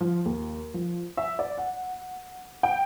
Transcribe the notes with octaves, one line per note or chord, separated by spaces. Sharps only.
F3
D#2
F3
E5
D5
F#5
G5